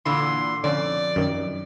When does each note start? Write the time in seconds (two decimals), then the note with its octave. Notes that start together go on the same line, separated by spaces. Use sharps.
0.06 A#2 D3 E3 C6
0.64 F2 D3 C#4 D5
1.16 F#2 D#3